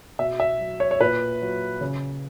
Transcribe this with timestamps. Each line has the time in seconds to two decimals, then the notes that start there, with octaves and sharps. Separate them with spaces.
0.19 B2 E5
0.40 E5
0.60 F#3
0.80 C#5
0.91 C#5
1.01 A#2 B4
1.41 F#3
1.81 C#3